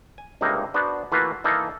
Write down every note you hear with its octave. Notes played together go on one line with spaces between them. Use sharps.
G#5
C#2 G2 C3 A#3 D#4 A#5
B3 D4 F#4 C5
E3 A3 A#3 F4 F#4 B4
E3 A#3 D#4 A4